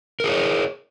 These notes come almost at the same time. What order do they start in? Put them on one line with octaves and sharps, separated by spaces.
A#4 G#4 C#5